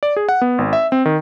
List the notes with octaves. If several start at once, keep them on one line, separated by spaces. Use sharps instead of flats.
D5
G#4
F#5
B3
G#1
E5
C4
D#3